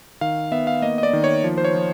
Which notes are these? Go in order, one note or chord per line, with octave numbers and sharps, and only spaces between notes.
D#3 F5
B3 E5
F5
A#3 D#5
D#5
D5
D#3
C#5
F3
C5
C#5
F3